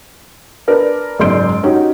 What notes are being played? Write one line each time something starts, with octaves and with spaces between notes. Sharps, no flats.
D4 A#4 B4 D5
F#1 G#2 D5 C6 G6 D7
C#4 D#4 F#4 G4